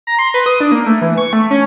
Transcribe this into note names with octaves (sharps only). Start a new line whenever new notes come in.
A#5
C6
B4
D#6
D4
A#3
A3
E3
C#6
A3
C#4